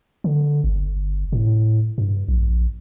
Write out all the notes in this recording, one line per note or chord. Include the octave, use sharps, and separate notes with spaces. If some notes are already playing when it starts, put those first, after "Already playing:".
D3
G1
A2
G2
A#1